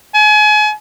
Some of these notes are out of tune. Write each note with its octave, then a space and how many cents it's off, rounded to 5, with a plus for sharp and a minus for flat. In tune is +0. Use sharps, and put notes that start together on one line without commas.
G#5 +35